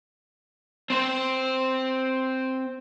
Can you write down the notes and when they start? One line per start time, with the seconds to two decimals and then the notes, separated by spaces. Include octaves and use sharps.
0.90 C4 C5